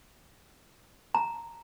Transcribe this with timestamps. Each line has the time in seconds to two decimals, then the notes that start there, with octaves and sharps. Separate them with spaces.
1.15 A#5